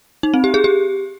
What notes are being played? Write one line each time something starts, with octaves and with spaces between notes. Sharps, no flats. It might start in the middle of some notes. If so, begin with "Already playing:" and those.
D#4
C4
G4
G#4
G4